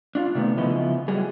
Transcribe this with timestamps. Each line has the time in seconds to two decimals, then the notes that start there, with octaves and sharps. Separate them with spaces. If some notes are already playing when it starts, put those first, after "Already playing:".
0.15 D4 F4
0.35 C3 D#3 A3 B3
0.57 C#3 F3 B3 E4 B4 D#5
1.08 F#3 G3 G#4